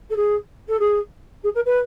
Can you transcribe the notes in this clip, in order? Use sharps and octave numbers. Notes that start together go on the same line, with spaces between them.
A4
G#4
A4
G#4
G#4
A#4
B4